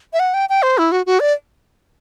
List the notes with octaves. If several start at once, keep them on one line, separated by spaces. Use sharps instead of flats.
E5
F#5
G5
G5
C5
E4
F#4
F#4
D5